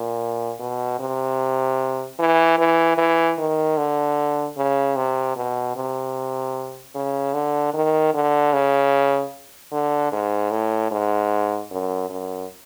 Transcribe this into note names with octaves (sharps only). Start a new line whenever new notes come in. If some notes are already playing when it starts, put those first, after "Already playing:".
Already playing: A#2
B2
C3
E3
E3
E3
D#3
D3
C#3
C3
B2
C3
C#3
D3
D#3
D3
C#3
D3
G#2
A2
G#2
F#2
F#2